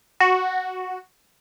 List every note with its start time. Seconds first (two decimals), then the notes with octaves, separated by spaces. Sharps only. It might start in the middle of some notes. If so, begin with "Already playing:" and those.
0.20 F#4